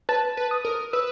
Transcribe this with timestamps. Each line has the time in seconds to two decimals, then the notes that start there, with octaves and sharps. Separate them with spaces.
0.09 B4 A5
0.37 B4
0.51 D#6
0.65 A#4
0.93 B4 E6